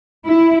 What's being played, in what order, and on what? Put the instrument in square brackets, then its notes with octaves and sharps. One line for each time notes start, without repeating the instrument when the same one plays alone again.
[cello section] E4